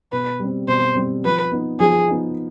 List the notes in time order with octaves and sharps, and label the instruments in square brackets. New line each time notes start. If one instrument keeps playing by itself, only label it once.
[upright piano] B2 [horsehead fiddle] B4
[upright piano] G3 C4
[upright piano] B2 [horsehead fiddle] C5
[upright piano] G3 C4
[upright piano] F3 [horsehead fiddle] B4
[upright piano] B3 D#4
[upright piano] F3 [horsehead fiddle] G#4
[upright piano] B3 D#4